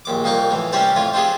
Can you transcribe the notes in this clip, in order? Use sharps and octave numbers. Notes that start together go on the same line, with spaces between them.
A#1 D#2 D6
C2 F2 A#3 D#4 C#6 D6
A2 E3
C3 G3 C#4 G4 C5 D5
F2 A2 F4 G#5
C4 D4 F4 G4 G#4